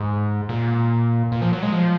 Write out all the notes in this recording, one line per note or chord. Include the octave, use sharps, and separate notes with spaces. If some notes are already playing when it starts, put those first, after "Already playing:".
Already playing: G#2
A#2
A#2
F3
F#3
G#3
F3